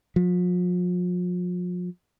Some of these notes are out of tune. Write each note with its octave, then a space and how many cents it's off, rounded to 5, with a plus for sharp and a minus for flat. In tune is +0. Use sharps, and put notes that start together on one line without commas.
F3 +40